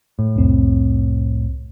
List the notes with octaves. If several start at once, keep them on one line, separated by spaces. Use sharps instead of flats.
A2
C2 F2 C4